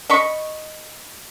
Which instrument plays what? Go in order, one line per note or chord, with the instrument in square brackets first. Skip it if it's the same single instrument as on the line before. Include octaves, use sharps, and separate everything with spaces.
[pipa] D#5 B5 C#6